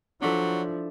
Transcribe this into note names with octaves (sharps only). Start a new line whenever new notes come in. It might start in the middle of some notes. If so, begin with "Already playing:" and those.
F3 F#3 D4 E4 A4